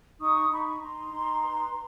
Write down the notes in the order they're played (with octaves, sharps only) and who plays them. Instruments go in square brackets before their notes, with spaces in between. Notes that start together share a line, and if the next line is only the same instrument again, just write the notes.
[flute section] D#4 C#6 D#6
D#4 B5 C#6
D#4 A#5 C6
D#4
B4